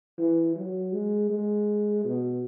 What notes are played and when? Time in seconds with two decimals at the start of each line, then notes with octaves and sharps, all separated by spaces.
0.19 E3
0.56 F#3
0.93 G#3
1.30 G#3
2.05 B2